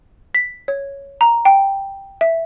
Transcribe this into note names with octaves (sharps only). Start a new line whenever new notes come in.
B6
C#5
A#5
G5
E5